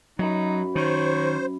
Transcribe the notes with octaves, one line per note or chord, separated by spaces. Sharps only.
F#2 F#3 D#4 B5
D#3 C5 C#5